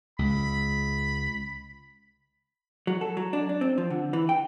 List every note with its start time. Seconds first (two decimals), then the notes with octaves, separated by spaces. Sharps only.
0.19 C#2 B5
2.87 F#3
3.01 A4
3.17 F#3
3.33 D4
3.49 D4
3.61 C4
3.78 F3
3.90 D3
4.13 E3
4.29 G5